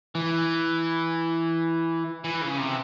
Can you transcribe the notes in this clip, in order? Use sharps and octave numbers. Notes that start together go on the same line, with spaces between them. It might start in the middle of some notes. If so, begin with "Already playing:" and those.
E3
E3
C#3
C3